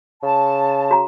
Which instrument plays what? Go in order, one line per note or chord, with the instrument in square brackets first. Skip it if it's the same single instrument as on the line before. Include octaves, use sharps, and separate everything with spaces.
[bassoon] C#3 [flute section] A5
[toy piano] F#4 A#5